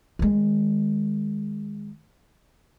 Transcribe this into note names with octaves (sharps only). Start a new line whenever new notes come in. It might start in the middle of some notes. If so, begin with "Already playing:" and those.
D#3 G#3